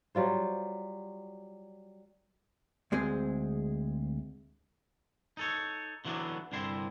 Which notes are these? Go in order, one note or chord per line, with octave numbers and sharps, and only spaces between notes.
F#3 G3 F4 C5
D2 G#3 C4 G#4 C5
D#4 A4 C#5
D3 E3 F#3 A#3 B3 D4
C2 G2 D3 C4 E4 C6